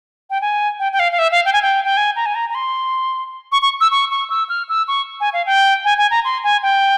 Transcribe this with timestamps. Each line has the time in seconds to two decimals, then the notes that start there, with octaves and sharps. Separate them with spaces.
0.30 G5
0.41 G#5
0.79 G5
0.92 G5
0.99 F5
1.12 F5
1.19 E5
1.32 F5
1.45 G5
1.53 G#5
1.62 G5
1.85 G5
1.97 G#5
2.16 A#5
2.26 G#5
2.35 A#5
2.50 A#5
2.55 C6
3.52 C#6
3.62 C#6
3.81 E6
3.91 C#6
4.11 C#6
4.30 E6
4.49 F6
4.69 E6
4.88 C#6
5.20 G#5
5.33 F5
5.46 G5
5.85 G#5
5.98 G#5
6.11 A#5
6.24 C6
6.44 G#5
6.63 G5